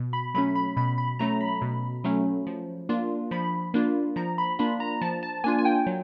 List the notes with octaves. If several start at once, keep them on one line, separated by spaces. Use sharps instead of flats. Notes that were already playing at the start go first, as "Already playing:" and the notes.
Already playing: B2
B5
F#3 A3 C#4 B5
B5
B2 B5
B5
F#3 A3 C#4 A#5
B5
B2
F#3 A3 C#4
F3
A#3 D4 F4
F3 B5
A#3 D4 F4
F3 A#5
B5
A#3 D4 F4 B5
A#5
F3 A5
A5
A#3 D4 F4 G#5
G#5
G5
F#3